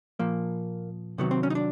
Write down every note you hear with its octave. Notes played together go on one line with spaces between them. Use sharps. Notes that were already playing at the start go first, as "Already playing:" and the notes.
A#2 F3 A#3
C3 D#3 F#3 B3
C4
C#4
D#4
D4